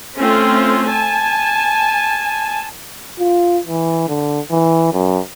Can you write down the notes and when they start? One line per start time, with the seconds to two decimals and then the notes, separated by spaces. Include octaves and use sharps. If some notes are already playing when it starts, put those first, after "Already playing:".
0.18 A3 C4 C#4 F4
0.88 G#5 A5
3.20 F4
3.67 E3
4.08 D3
4.51 E3
4.93 F#2